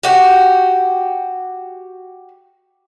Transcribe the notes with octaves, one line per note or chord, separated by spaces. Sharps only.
F#4 G4